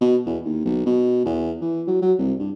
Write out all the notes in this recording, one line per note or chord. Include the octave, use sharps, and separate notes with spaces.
B2
E2
D#2
B1
B2
E2
E3
F#3
F#3
C2
G2